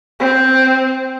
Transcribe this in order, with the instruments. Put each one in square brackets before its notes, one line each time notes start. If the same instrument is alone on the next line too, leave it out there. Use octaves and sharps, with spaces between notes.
[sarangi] C4